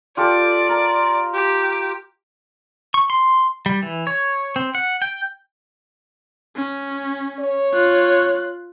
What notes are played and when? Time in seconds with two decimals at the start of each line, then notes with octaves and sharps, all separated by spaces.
0.17 F4 G4 A4 D5
0.69 A#4
1.34 G4
2.94 C#6
3.10 C6
3.66 G3
3.83 E3
4.07 C#5
4.56 C4
4.75 F#5
5.02 G5
6.56 C#4
7.40 C#5
7.74 F4 F#6